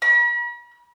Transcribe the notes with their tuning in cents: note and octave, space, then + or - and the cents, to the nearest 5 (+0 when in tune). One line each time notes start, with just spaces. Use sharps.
B5 -45